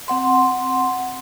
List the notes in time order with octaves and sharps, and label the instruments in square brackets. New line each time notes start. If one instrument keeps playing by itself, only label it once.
[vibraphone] C4 F#5 C6